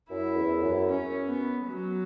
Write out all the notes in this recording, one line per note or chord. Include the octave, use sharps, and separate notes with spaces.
F#2 E4
E2
F#2
C#4
B3
F#3